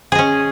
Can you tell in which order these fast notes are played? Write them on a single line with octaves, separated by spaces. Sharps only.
G#4 D#5 C#4